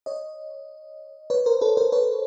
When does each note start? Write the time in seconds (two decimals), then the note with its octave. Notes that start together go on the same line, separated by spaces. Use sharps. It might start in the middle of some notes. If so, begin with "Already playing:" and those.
0.06 C#5 D#5
1.30 B4 C#5
1.46 A#4 C5
1.61 A4 B4
1.77 A#4 C5
1.92 B4 C#5